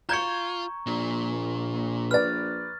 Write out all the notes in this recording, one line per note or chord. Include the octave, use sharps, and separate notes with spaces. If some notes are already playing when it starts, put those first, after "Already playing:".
F4 A#5 C#6 G6 G#6 C#7
A#1 A#2
B4 D5 F6 A6